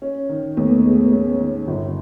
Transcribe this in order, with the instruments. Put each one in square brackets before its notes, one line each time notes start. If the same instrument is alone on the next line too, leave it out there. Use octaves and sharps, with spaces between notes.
[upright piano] C#4
D#3
[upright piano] D#2 [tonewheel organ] A3 B3
[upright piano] G#3
C#4
D#3
G1